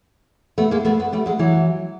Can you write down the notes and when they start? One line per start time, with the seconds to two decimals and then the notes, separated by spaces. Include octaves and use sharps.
0.58 A3 B3
0.71 G#3 A#3
0.85 A3 B3
0.99 A3 B3
1.13 G3 A3
1.26 F#3 G#3
1.39 E3 F#3